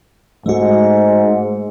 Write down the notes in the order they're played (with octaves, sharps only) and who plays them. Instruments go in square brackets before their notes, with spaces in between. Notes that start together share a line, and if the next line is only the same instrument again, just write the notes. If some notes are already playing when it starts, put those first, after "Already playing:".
[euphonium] G#2 [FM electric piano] A3 F#4